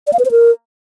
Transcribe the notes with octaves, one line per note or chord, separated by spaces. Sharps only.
D5
F5
B4
C5
A#4